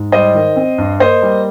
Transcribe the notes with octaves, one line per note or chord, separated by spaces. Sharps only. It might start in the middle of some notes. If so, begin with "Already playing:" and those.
Already playing: G#2
G3 C5 D#5
D#3
C4
G2
A#3 C5 D#5
G3